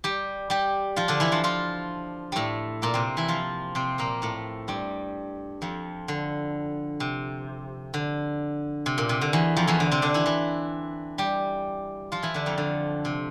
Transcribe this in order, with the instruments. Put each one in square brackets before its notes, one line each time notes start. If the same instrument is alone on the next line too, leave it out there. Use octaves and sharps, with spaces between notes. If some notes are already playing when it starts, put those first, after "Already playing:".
[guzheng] G3 G4
G3 G4
F3 F4
D3 D4
E3 E4
F3 F4
F3 F4
A2 G3 A3
A#2 A#3
C3 C4
E3 E4
F3 F4
C3 C4
A#2 A#3
A2 A3
G2 G3
F2 F3
D3
C3
D3
C3
A#2
C3
D3
E2 E3
F2 F3
E2 E3
D3
C3 C4
D3 D4
E3 E4
E3 E4
G3 G4
F3 F4
E3 E4
D3 D4
F2 F3
D3
C3